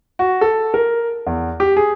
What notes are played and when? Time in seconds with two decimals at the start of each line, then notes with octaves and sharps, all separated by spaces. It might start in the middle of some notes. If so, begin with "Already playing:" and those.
0.19 F#4
0.41 A4
0.74 A#4
1.27 E2
1.60 G4
1.77 G#4